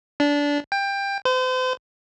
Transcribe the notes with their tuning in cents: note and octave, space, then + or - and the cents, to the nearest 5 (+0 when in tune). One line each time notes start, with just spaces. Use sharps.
D4 -20
G5 +20
C5 -40